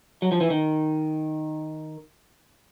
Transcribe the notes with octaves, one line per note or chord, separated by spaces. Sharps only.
F#3
F3
E3
D#3